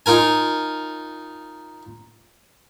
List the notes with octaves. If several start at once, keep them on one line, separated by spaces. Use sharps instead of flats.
D#4 F4 A#4 G#5